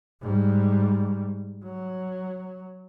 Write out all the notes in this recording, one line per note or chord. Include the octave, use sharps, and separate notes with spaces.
G#2 G3
F#3